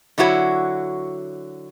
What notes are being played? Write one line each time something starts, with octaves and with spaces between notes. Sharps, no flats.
D3 F#3 E4 F#4 A#4 C#5